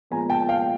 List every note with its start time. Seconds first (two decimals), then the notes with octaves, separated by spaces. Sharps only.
0.11 A#2 F3 G#3 B3 G#5 A#5
0.30 G5 A5
0.49 F5 G5